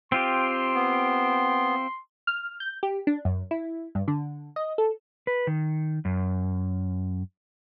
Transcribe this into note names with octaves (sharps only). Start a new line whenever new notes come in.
C4 F4 G4 C6
B3
F6
G6
G4
D4
F#2
E4
G2
D3
D#5
A4
B4
D#3
F#2